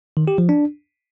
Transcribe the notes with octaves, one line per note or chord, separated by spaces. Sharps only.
D#3
G4
F3
D4